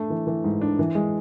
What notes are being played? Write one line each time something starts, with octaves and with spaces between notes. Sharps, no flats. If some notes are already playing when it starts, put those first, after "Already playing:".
Already playing: A3 D4
E3
E3
G#2
D4
E3
G#3